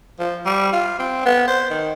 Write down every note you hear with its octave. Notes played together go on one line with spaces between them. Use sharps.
F3
G3
F4
C4
B3
C5
D#3